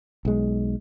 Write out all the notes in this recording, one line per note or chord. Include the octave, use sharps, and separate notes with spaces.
B1 G#3